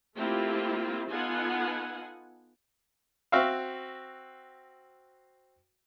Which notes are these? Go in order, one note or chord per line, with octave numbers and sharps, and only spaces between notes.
A3 A#3 C4 E4 F4 G4
B3 D#4 F4 A4 F#5 G#5
C4 F#4 E5 F5